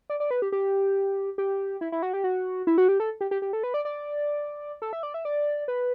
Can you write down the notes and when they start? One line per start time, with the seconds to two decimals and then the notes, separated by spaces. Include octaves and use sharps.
0.10 D5
0.20 D5
0.31 B4
0.42 G4
0.52 G4
1.38 G4
1.81 E4
1.92 E4
2.02 F#4
2.13 G4
2.24 F#4
2.67 E4
2.78 F#4
2.88 G4
3.00 A4
3.21 G4
3.31 G4
3.42 G4
3.53 A4
3.63 B4
3.74 D5
3.85 D5
4.82 A4
4.93 E5
5.03 D5
5.14 E5
5.25 D5
5.68 B4